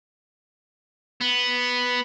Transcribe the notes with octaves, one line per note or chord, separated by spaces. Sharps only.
B3